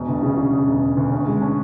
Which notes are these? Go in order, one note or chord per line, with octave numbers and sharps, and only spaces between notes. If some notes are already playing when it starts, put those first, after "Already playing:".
Already playing: E1 B2
D2
C#3
C#3
C#3
E1
E1
D2
C#4
G#3
C#4